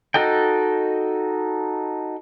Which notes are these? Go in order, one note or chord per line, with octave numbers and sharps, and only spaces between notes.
D#4 F#4 A4 D#5 G5